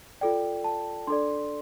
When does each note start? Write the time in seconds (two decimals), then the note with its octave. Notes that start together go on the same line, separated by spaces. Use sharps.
0.21 F4 A4 D5 G5
0.64 A5
1.07 D4 A4 D5 C6